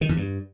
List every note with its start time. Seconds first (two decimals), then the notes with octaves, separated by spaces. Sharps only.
0.01 D#3
0.09 E2
0.17 G2